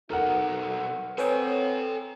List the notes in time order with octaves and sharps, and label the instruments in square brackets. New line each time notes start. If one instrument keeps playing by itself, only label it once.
[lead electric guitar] B1 A4 [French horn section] D#4 [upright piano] A#4 F#5
[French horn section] C4 [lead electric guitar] A4 G#5 [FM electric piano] B4 C#5 G5